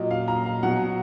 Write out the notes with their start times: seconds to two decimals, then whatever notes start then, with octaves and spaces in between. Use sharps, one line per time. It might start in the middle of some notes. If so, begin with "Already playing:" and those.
Already playing: A#2 F#3 D#5
0.11 F5
0.28 A#5
0.46 F5
0.63 B2 F#3 F#5